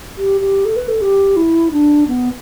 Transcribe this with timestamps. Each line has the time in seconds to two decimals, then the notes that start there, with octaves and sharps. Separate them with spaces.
0.17 G4
0.41 G4
0.65 A4
0.76 B4
0.88 A4
1.01 G4
1.36 E4
1.72 D4
2.08 B3